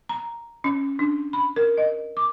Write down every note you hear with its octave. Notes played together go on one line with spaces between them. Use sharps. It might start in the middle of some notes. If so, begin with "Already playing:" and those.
A#5
C#4
D4
B5
A#4
D#5
D6